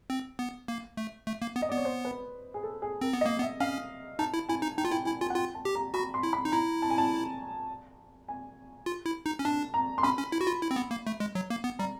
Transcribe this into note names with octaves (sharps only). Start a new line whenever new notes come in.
C4
B3
A#3
A3
A3
A#3
B3
D#5
B3 D5
C#5
C5
B4
G#4
A4
G#4
C4 A#4
B3
D#5
A#3
B3
E5
C#4 F5
D#4 A5
E4
E4 G#5
D#4
D#4 G5
F4
E4 G5
E4 G#5
F4 G#5
F#5
F4 G5
A5
G4
A#5
F#4 B5
C6
E4
B5
D#4
E4 A#5
A5
G#5
A5
G#5
F4
E4
D#4
C#4
D4 A5
A#5
C6
C#4 B5
C#4
E4
F#4
F4
E4
C4
B3
A#3
A3
G#3
F#3
A#3
B3
G3 A#5